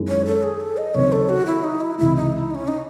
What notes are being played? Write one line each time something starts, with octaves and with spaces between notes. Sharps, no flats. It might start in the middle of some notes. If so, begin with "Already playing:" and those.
Already playing: F#2 D#3 G#3 C#4 E4
C#5
A4
G#4
A4
D#5
D#2 C#3 F#3 C4 D#4 C#5
A4
F#4
E4
D#4
E4
C#2 C3 E3 G#3 E4
D#4
E4
D#4
C#4
D#4